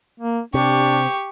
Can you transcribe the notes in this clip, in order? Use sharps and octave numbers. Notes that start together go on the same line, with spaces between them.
A#3
C3 D4 G4 C#6